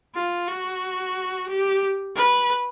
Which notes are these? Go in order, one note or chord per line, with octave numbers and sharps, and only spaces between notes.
F4
F#4
G4
B4